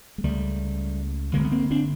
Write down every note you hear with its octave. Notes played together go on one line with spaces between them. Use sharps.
G#3
C#2 C#3 G3 A3
G1 G2 D3 G#3 A#3
B3
A#3 C4
C4 D4